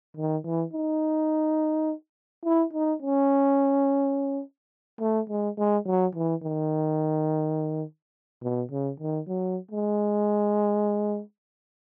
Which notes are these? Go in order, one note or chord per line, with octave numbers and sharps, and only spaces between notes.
D#3
E3
D#4
E4
D#4
C#4
A3
G#3
G#3
F#3
E3
D#3
B2
C#3
D#3
F#3
G#3